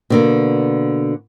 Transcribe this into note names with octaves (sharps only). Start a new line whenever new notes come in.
B2 D3 A#3